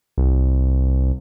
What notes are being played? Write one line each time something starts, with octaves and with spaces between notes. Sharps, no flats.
C2